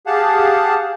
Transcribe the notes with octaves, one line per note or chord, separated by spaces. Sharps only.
G4 G#4 F5 F#5 A5